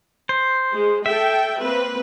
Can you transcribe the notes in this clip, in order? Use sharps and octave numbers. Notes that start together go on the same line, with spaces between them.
C5
G#3
A4 E5 G5
A#3 C4 B4